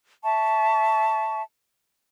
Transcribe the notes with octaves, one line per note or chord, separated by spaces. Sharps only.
E5 A5 C#6